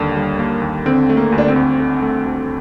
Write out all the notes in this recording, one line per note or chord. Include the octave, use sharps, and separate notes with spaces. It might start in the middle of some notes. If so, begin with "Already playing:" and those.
Already playing: D#2 D3 G3 A#3
G3
A#3
D#2
D3 C4
A3
A#3
D2
D4
C4
D2
D3
A3
D2